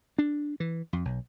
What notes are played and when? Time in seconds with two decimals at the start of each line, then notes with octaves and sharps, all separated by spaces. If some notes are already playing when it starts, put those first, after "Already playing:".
0.18 D4
0.60 E3
0.93 F2
1.05 B1